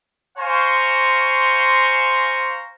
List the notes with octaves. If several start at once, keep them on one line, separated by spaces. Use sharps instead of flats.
C5 F5 G#5 A#5 C6 C#6